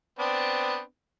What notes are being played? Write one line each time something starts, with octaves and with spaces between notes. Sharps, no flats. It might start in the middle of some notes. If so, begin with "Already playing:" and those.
B3 C4 D4